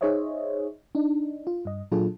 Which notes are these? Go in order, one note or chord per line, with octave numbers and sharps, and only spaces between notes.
D#4 G#4 C5 C#5 D#5 E5
D4 D#4
F4
G2 D#5
A#2 F#3 D4 F4 G#4 A4